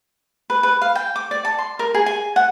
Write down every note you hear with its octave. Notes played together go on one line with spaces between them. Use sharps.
B4
B4
F5
G5
D6
D5
A5
C6
A#4
G#4
G#5
F#5